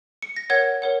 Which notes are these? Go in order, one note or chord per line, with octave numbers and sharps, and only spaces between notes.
C#7
A#6
A#4 C#5 F#5 G#6
A#4 C#5 F#5